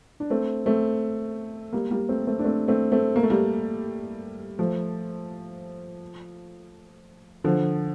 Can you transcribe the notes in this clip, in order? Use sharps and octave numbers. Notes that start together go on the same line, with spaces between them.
D4
A3 C4
A3 C4
G3 A#3
G3 A#3
A3 C4
A3 C4
D4
A3 C4
A3 C4
A3 C4
A#3
A3
G3 A#3
F3 A3
D3 F3